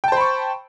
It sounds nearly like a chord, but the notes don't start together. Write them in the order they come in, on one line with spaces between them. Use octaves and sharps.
G5 A5 C5 B5 C#6